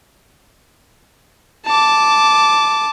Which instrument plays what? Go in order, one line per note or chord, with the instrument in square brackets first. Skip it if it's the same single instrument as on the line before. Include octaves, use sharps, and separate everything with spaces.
[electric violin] A5 D6